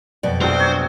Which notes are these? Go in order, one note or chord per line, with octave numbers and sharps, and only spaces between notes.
F2 B2 D5
A#1 F#3 C5 G5
C#5